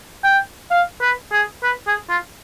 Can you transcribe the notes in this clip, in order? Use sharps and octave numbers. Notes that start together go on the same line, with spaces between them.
G5
F5
B4
G#4
B4
G#4
F4